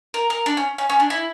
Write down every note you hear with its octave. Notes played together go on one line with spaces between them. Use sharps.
A#4
A#4
D4
C#4
C#4
C#4
D4
E4